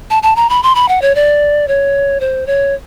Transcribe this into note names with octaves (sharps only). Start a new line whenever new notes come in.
A5
A5
A#5
B5
C6
B5
F#5
C#5
D5
C#5
C5
C#5